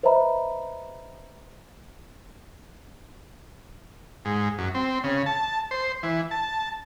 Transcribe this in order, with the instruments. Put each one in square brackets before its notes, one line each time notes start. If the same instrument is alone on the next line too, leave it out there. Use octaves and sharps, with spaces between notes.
[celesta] B4 C5 D#5 E5 A#5 B5
[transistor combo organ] G#2
F#2
C4
C#3
A5
C5
E3
A5